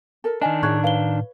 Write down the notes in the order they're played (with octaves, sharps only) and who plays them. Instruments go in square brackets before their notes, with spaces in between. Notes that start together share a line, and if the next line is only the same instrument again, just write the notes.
[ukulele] A4 A#4
[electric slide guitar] D#3 D4 [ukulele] D#5 G#5
[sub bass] A2 [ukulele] E4 G#4 C#5 [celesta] C#6 F#6 G#6
[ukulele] B4 C#5 [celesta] F5 G7